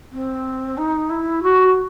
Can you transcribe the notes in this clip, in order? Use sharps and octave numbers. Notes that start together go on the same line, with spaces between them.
C4
D#4
E4
F#4